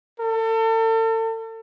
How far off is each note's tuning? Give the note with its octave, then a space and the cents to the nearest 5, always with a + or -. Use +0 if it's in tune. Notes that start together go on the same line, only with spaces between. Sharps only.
A4 +35